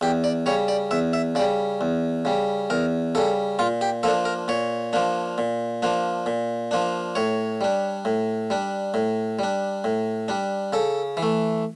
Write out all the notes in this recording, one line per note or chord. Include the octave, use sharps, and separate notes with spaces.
E2 G4
D5
C#3 G3 C#5
D5
E2 E5
E5
C#3 G3 D5
E2
C#3 G3
E2 A#4
C#3 G3 A4
A#2 F4
G4
F3 A#3 D4 A4
A#4
A#2 C#5
F3 A#3 D4
A#2
F3 A#3 D4
A#2
F3 A#3 D4
A2 C#5
G3 D4
A2
G3 D4
A2
G3 D4
A2
G3 D4
C#3 A4
E3
A3